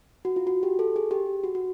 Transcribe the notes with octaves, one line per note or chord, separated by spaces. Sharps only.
F#4
F4
F#4
G4
A4
G#4
G4
F#4
F#4